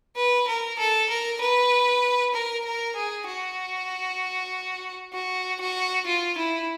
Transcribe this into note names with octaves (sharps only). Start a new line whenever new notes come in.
B4
A#4
A4
A#4
B4
A#4
A#4
G#4
F#4
F#4
F#4
F4
E4